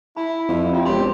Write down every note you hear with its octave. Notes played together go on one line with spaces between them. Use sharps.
E4 B5
F2
C4 F4 C#5
E1 G4 B5 C6